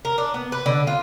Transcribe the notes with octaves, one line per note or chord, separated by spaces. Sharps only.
A#4
D4
B3
B4
D3
F4